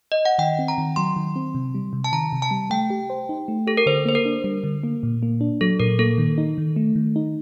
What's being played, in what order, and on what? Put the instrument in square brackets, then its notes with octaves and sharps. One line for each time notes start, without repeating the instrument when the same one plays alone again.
[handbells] D#5
F#5
[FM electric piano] D#3 [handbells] G5
[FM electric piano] C4
[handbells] A#5
[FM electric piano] D#3
[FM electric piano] F#3 [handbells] C6
[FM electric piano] D#3
C4
C3
G3
C3
[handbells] A5
[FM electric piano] D#3 [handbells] A#5
[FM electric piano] C3
[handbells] A5
[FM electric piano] G3
[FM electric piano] A3 [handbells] G5
[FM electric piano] G4
C5
D#4
A3
[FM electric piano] G4 [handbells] A4
[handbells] A#4
[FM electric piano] D3 [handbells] C5
[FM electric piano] A#3 [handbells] C5
[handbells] A#4
[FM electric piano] D4
G3
D3
A#3
A#2
A#3
D4
[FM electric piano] F#3 [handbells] A4
[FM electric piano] A#2 [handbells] A#4
[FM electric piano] A#3 [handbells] A4
[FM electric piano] D#3
D#4
D#3
A3
D#3
D#4